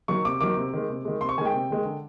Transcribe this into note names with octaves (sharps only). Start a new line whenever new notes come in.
D#3 F#3 C#6
C3 D6
D#3 F#3 D6
C3
D#3 G#3
C3
D#3 G#3
C3 C6
C#6
D#3 G#3 G5 G#5
C3
D#3 G#3
D3